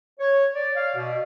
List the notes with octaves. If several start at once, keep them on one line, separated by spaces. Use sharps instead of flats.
C#5
D5
F5
B2